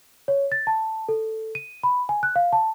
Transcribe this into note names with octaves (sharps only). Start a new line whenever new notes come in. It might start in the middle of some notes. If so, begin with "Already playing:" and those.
C#5
A6
A5
A4
D#7
B5
G#5
F#6
F5
A5